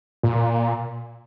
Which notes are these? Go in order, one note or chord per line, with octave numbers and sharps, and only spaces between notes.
A#2